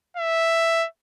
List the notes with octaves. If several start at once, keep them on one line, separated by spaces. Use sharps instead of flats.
E5